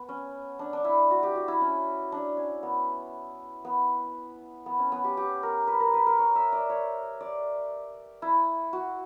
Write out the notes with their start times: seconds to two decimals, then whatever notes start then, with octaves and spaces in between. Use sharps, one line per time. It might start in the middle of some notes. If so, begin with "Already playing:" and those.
Already playing: B3
0.09 C#4
0.59 D4
0.73 D4
0.85 E4
1.11 F#4
1.23 G4
1.35 F#4
1.48 E4
1.61 C#4
2.12 D4
2.37 C#4
2.63 B3
3.65 B3
4.66 B3
4.79 C#4
4.92 B3
5.04 G4
5.17 G4
5.43 A#4
5.67 B4
5.80 A#4
5.94 B4
6.07 A#4
6.19 C#5
6.36 E5
6.52 D5
6.70 C#5
7.21 D5
8.22 E4
8.73 F#4